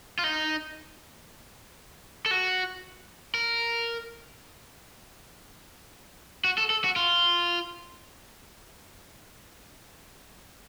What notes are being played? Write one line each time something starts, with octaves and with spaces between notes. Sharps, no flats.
F4
D#4
A4
F#4
A#4
F#4
A4
A4
F#4
F4